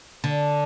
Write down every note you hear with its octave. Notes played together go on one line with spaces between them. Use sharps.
D3